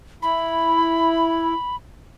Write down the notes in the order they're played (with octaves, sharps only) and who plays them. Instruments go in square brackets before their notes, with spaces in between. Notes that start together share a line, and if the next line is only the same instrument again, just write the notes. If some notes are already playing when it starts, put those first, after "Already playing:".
[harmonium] E4 [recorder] B5